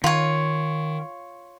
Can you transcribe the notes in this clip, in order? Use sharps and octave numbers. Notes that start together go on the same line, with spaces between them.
D#3 F4 C#5